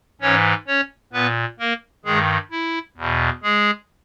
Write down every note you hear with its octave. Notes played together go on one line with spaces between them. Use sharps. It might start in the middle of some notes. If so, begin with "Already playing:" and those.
G#2 E3 C#4 C#5
C#4 C#5
A#2 B3 B4
A#3 A#4
G2 D#3 G#3 G#4
E4
E2 B2
G#3 G#4